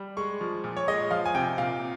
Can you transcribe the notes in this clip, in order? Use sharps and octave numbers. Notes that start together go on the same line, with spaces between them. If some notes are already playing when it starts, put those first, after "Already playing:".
Already playing: G3
G#3 C#6
F3
A#2
C#5
G#3 D#5
F3 F5
G#5
C3 G5
A#2 F5